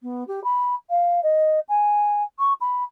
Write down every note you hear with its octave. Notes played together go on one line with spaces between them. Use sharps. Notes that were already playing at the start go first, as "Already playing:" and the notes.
B3
G4
B5
F5
D#5
G#5
C#6
B5